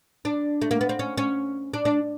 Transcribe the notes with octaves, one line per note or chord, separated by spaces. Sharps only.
D4
A3
A#3
B3
C4
C#4
C#4
D4
D4